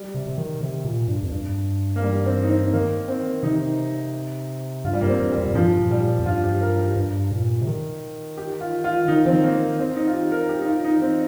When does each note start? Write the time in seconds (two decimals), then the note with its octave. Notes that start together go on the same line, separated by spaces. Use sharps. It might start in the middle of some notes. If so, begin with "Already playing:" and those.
Already playing: G3
0.14 C3
0.27 C3
0.38 D#3
0.61 C3
0.85 A#2
1.08 G2
1.23 F2
1.32 G2
1.96 A#3
2.02 G3
2.26 C4
2.43 D#4
2.50 C4
2.73 D#3 A#3
3.08 C4
3.43 C3 D#4
4.85 G2 F4
4.93 G3
5.01 G2 A#3
5.08 C4
5.19 G2
5.32 G3
5.37 F2
5.47 A#2
5.55 G2 F3
5.79 A#2
5.91 G3
6.02 A#2
6.19 F2
6.25 G2 F4
6.44 G4
6.61 A#4
6.79 G4
6.96 G2
7.32 A#2
7.61 C3
7.67 D#3
8.38 G4
8.61 F4
8.84 F4
9.08 D#3 D#4
9.25 F3 C4
9.32 D#3
9.43 A#3
9.79 C4
9.96 D#4
10.07 F4
10.14 G4
10.32 A#4
10.49 G4
10.61 D#4
10.67 F4
10.84 D#4
11.02 C4